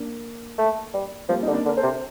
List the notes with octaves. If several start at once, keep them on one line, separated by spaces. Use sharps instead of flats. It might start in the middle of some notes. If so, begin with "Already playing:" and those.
Already playing: A#3 D4
A3
G3
F3 G3 A#3
D3 D#4
A#3 D4
D3
A#4
A4 C5
C3